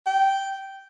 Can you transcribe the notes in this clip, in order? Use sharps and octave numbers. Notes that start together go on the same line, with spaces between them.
G5